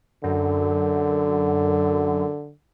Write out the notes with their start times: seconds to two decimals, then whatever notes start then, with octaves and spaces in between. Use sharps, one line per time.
0.24 F#2 D3